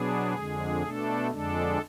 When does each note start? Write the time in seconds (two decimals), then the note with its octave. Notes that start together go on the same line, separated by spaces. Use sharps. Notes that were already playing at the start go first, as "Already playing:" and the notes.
Already playing: B2 F#3 B3 D4 G#4
0.35 F2 D3 G#3
0.82 B2 A3 D4 A4
1.31 F2 D3 G#3 D4 A4